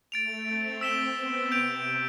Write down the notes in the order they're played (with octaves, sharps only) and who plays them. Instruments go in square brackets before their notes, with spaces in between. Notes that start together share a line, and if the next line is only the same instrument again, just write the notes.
[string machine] A3 [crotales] A6 D7 F7
[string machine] C4
[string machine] C4 [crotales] E6 B6 E7 G7
[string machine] B3
[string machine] C3 [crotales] G6 D7 F7